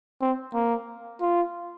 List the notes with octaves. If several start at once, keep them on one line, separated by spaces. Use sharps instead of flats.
C4
A#3
F4